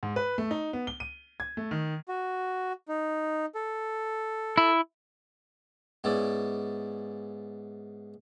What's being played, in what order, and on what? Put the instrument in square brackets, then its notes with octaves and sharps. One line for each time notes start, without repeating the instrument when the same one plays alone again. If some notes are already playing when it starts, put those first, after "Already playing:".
[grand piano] G#2
B4
A3
D#4
B3
G7
D#7
G#6
A3
D#3
[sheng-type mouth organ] F#4
D#4
A4
[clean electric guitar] E4
[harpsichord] G#2 B3 C#4 E4 D5